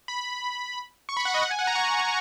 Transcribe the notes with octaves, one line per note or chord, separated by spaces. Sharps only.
B5
C#6
B5
F#5
D#5
F#5
G#5
F#5
A#5
C#6